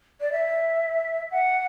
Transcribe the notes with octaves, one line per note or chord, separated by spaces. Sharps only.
D5
E5
F#5